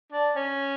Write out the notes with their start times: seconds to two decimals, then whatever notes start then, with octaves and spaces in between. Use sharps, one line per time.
0.12 D4
0.36 C#4